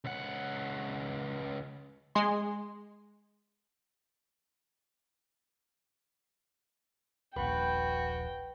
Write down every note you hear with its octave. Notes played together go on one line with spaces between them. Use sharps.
C#2 F#5
G#3 C6
D#1 A#1 F#4 B4 G5